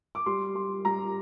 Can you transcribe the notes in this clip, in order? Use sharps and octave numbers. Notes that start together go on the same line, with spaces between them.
D6
G3 C6
G3 C6
G3 A#5